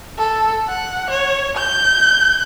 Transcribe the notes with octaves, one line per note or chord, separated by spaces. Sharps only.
A4
F#5
C#5
G6